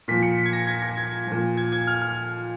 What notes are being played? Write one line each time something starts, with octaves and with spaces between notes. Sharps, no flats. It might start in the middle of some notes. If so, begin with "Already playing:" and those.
A#2 F3 B6
C#7
G#6
A#6
G#6
G#6
G#6
A#2 F3
G#6
G#6
F6
F6